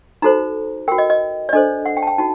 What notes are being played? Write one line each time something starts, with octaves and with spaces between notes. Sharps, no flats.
D#4 F#4 A4 C5 A#5
F#4 A#4 G5
D#5
D#5
D5
D4 A4 C5 D#5
F#5
G5
A5
G5
D#4 F#4 A5